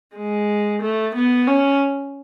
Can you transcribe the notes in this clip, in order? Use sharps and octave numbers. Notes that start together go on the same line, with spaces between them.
G#3
A3
B3
C#4